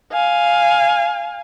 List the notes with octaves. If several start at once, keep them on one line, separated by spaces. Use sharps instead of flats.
F5 G#5